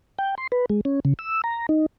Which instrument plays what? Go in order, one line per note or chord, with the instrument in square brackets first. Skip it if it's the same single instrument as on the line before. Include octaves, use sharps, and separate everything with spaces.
[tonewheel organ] G5
C6
B4
G#3
C#4
C#3
E6
A#5
D#4